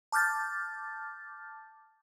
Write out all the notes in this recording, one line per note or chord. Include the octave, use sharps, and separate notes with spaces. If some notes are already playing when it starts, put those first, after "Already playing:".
A5 D6 F6 G6 A6